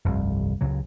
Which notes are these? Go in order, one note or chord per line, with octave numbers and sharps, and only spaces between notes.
F1 C2 G2
C#2 C#3 F#3